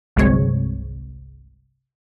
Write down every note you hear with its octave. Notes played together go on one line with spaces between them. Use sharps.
G1 C2 F#3 G#3 C4 C#5